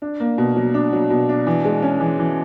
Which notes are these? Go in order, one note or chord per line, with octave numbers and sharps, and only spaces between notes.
D4
A#3
B2
F#3
D4
F#3
B2
D4
E3
G#3
C#4
E3
E3